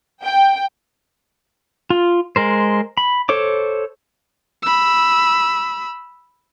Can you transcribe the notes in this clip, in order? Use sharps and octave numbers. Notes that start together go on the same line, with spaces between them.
G5
F4
G#3 A#4 C5
B5
A4 C5 C#5 D6
B5 E6